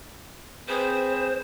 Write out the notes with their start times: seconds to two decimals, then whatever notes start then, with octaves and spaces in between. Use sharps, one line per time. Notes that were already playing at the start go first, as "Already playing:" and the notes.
0.69 C4 G#4 B4 C5